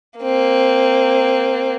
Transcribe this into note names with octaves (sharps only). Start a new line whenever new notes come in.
A#3 C4